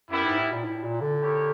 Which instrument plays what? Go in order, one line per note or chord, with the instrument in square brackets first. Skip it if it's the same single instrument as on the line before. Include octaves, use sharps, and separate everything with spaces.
[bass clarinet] F#2 [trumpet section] G3 B3 E4
[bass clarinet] G#2
A2
A#2
A2
A#2
D3
[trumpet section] E4 G4 A#4 C#5